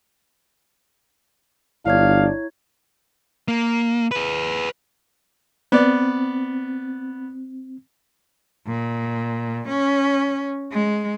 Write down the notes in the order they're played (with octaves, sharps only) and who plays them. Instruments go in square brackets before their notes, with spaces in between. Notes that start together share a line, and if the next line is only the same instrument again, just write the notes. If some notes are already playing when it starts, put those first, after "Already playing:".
[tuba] G1 [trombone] D4 [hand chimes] E4 C#5 G#6 [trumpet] F5
[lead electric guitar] A#3
G#4 B4
[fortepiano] B3 D5 [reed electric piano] C4
[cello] A#2
C#4
G#3